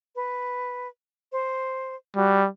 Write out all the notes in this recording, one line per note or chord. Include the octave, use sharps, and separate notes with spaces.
B4
C5
G3 F#4